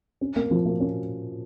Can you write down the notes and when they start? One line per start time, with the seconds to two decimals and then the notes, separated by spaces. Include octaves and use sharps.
0.21 C#4
0.36 A#3
0.51 F3
0.66 A#3
0.80 C#4